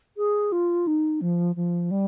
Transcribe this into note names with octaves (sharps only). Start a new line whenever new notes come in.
G#4
F4
D#4
F3
F3
G3